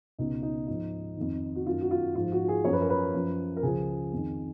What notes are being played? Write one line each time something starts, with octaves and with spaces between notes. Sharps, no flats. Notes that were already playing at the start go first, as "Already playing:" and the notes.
C#2 B2 D#4
D#4
G#2 F3 D#4
F2 D#3
F#4
F#2 D#3 F4
F#4
F4
G#2 F3 F4
F#4
G#4
F#2 F3 C#5
B4
A#4
B4
F#2 F3
A#4
C#2 C#3 F3 G#4
F2 D#3